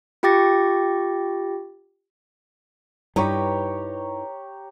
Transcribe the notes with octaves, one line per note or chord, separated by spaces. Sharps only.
F4 G4 G5 D6 A6 A#6
G2 G3 D#4 E4 G4 B4 C#5 A#5